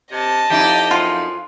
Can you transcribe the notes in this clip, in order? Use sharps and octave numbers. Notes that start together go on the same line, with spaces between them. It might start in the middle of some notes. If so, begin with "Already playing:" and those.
C3 D#5 A5
F2 D#4 E4 G4
F#2 F4